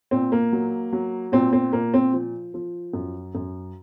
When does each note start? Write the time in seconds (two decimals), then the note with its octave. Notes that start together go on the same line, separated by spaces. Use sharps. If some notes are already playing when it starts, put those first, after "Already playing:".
0.11 A#2 C4
0.32 A#3
0.52 F#3
0.92 F#3
1.32 A#2 C4
1.53 C4
1.73 A#2 A#3
1.94 C4
2.13 F3
2.54 F3
2.93 F#2
3.35 F#2